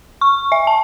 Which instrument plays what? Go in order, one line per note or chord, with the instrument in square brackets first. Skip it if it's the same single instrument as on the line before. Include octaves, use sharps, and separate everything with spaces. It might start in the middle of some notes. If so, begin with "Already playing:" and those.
[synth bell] C#6
E5
A5